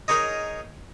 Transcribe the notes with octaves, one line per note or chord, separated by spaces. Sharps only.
D#4 G#4 A#4 C#5 D#5